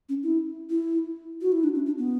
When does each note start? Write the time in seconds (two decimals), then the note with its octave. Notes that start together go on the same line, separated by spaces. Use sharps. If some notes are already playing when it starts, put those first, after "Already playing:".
0.09 C#4
0.23 E4
0.70 E4
1.42 F#4
1.52 E4
1.64 D4
1.75 C#4
1.86 D4
1.98 B3